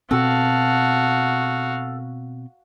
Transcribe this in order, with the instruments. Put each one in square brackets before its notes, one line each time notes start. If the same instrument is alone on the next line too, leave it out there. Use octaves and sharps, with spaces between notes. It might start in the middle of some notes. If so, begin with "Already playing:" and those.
[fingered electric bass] B2 C4 [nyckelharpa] F#4 F5 [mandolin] A4